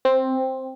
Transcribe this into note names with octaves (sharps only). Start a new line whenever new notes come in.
C4